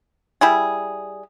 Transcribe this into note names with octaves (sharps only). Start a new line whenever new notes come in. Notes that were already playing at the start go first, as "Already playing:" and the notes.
G3 E4 G#4